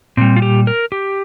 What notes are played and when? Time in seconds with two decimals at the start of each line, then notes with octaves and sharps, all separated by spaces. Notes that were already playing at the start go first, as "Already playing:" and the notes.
0.17 A#2 G3 C4
0.36 F4
0.42 G4
0.67 A#4
0.92 G4